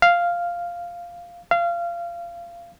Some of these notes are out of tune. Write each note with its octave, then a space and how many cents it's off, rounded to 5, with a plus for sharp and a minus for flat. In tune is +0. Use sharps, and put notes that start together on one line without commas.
F5 -5
F5 -25